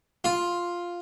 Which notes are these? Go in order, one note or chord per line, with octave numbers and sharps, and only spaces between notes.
F4